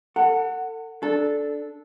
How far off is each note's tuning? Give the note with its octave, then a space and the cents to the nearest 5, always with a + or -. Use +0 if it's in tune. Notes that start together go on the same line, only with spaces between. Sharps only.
A4 +40 F#5 +0
D4 +0 A4 -10